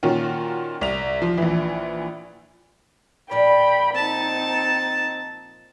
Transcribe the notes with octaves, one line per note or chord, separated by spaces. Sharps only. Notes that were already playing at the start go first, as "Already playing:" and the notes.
A#2 D#3 C#4 F4 F#4
C2 F7
F3
A#1 E3
A#2 F3 D5 G5 B5
C4 D#4 A5